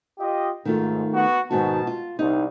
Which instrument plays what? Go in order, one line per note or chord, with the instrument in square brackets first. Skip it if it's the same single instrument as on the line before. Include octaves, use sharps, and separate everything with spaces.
[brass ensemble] F4 G4 D#5
[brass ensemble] G#2 [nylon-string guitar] D#3 A3 F4
[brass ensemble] B3 F#4
[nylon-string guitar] G#2 D#3 F#4 [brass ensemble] B2 A5
[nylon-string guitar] F4
[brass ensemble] C2 [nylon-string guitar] D#4